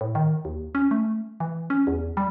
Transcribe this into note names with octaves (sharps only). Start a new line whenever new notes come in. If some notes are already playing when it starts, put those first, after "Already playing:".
A2
D#3
D#2
C#4
A3
E3
C#4
E2
G3